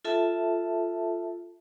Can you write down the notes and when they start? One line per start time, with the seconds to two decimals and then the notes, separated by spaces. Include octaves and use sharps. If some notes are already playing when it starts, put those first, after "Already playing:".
0.05 F4 A4 E5 A5